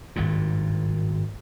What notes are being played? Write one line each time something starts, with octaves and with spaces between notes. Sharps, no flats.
G#1 G2 A#2